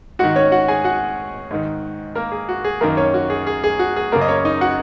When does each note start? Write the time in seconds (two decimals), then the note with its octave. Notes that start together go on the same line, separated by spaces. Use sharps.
0.19 G#2 D#3 F#4 F#5
0.36 C#4 C#5
0.52 F#4 F#5
0.68 G#4 G#5
0.84 F#4 F#5
1.51 G#2 D#3
2.15 A#3 A#4
2.31 G#4
2.49 F#4
2.64 G#4
2.81 F#2 D#3 A#3 A#4
2.97 C#4 C#5
3.14 F#4
3.30 G#4
3.47 G#4
3.64 G#4
3.79 F#4
3.96 G#4
4.12 F#2 C#3 A#3 A#4
4.21 D#5
4.28 C#4 C#5
4.45 D#4 D#5
4.61 F#4 F#5